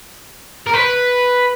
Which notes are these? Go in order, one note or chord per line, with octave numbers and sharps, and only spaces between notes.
A#4
B4